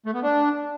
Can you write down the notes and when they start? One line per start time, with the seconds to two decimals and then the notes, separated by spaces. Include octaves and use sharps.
0.06 A3
0.14 B3
0.23 D4